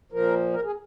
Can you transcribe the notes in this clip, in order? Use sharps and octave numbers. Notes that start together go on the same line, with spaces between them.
A#2 F3 A#4
A#4
G#4